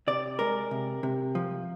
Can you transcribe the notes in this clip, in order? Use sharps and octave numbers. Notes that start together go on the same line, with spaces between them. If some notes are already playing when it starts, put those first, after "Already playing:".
C3 D5
G#3 A#4
C3
C3
F3